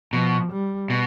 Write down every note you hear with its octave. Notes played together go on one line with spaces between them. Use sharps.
B2 F3
G3
B2